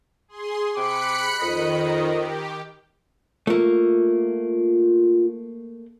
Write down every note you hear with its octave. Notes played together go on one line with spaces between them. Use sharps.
G#4 C6
C3 G5 B5 D6 F#6 C#7
F2 D#3 D#5
G4
A3 A#3 F4